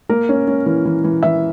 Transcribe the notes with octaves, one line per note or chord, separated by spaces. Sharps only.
A#3 A#4
C#4
C#4
E3
E3
E3
E3 E5